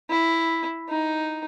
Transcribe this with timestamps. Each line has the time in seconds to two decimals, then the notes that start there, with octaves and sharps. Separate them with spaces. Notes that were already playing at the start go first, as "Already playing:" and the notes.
0.10 E4
0.89 D#4